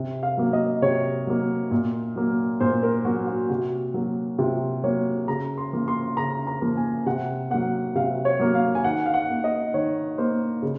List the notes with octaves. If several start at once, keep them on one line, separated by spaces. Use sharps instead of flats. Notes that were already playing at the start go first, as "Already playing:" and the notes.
Already playing: C3
F5
F#3 A#3
D#5
C3 C#5
F#3 A#3
A#2
F#3 A#3
A#2 C5
A#4
F#3 A#3 F#4
F#4
C3 F#4
F#3 A#3
C3 F4
F#3 A#3 C#5
C#3 A#5
C6
F3 A#3
C6
C#3 A#5
A#5
F3 A#3
G#5
C3 F#5
F#3 A#3 F#5
C3 F5
C#5
F#3 A#3
F5
G#5
D#3 F#5
F5
F#5
A#3
D#5
D#3 C#5
A#3 C5
C#3